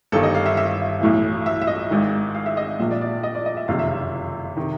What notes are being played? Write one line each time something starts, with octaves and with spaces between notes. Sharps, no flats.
G1 G2 D#3 A4
D#5
F5
E5
E5
B1 A2 E3
E5
E5
D#5
G#1 G#2 D#3
F5
E5
D#5
A#1 A#2 E5
D5
D5
D#5
D5
D#5
E5
F#1 F2 C3 D#3 F5
E5
F5
C3 D#3